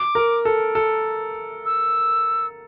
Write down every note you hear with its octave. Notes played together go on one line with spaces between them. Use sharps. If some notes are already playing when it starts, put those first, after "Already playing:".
Already playing: D6
A#4
A4
A4
E6